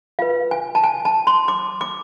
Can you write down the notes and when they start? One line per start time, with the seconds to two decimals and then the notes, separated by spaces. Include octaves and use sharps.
0.19 F4 B4 F5
0.51 G#5
0.75 A5
0.84 G#5
1.05 A5
1.27 C6
1.48 D6
1.81 D6